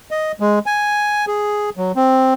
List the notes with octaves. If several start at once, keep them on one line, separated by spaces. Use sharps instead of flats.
D#5
G#3
G#5
G#4
F#3
C4